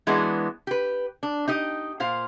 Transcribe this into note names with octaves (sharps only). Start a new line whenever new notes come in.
E3 G#3 B3 D4 E4 F#4
G4 B4
D4
D#4 G4 D#5
A#2 C5 F5